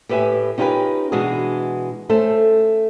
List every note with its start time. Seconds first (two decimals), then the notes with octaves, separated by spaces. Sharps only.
0.09 A2 G4 B4 E5 G#5
0.58 C#4 D#4 F4 G4 A#4 B4
1.12 B2 E3 G#3 D4 F#4 G#4
2.09 A3 C#4 A4 C5